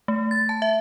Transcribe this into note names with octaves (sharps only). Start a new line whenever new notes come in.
A3
A6
A5
E5